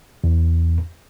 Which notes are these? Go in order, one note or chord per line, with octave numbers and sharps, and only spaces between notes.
E2